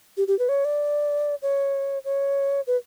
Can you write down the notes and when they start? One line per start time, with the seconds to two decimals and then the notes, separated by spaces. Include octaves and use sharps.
0.17 G4
0.28 G4
0.39 B4
0.49 C#5
0.65 D5
1.42 C#5
2.05 C#5
2.67 B4